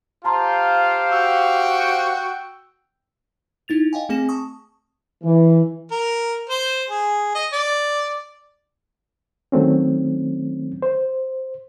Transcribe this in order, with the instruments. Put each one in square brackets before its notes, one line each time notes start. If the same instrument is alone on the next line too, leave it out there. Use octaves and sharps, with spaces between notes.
[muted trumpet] F4 [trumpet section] G4 C5 F5 [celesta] A5 A#5 C6
[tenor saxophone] F#4 [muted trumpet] G5 [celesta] E6
[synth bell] D#4 E4 A6 F7
D#5 F5 G5 G#5
A3 C4 G#4 G#5 A#6 E7
A5 C#6 D#6
[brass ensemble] E3
[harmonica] A#4
C5
G#4
D#5
D5
[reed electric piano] D#3 F#3 A3 C4 C#4
C5